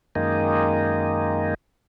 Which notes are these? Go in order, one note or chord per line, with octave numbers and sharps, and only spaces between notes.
F#2 D#3 G#3 A#3 D#4